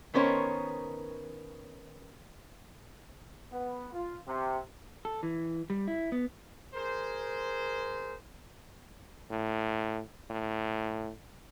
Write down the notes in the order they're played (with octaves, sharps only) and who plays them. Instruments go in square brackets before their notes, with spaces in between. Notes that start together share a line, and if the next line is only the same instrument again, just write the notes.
[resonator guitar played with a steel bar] D#3 B3 C#4 A#4 C5 C#5
[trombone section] B3
F4
C3
[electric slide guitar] A4
E3
G3
E4
B3
[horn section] G#4 A#4 C5
[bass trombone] A2
A2